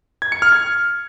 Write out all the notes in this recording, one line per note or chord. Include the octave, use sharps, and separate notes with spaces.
G#6
C#7
F6
G#6